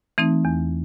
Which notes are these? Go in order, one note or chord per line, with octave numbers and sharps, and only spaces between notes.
E3 A3 C4 D#4
E2